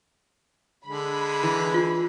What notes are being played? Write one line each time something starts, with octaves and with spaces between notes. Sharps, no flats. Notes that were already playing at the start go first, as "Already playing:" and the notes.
D3 G#3 B5
E3
F4